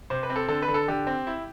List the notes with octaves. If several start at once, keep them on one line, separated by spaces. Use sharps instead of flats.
C3 C5
B4
C4
A4
D3 A4
B4
D3
A4
D3 G4
C4
E4